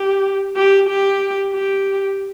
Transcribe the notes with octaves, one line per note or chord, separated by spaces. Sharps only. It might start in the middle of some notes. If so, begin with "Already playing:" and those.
Already playing: G4
G4
G4
G4